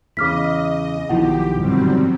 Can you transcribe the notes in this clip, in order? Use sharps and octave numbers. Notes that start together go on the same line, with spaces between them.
E2 C#3 E4 D#5 D6 F6 B6
B1 B2 D#3 F3 E4 G4 F#5
G1 G#2 F#3 G3 C4